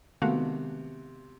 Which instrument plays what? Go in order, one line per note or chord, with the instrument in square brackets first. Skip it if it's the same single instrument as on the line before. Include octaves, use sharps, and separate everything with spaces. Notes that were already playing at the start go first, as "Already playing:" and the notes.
[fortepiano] C3 [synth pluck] D#3 G#3 B3 [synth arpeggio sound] A3 F#4 F5